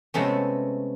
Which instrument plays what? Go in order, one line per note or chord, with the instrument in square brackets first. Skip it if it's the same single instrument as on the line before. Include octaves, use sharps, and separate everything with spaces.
[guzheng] C3 G#3 A3 B3 C#4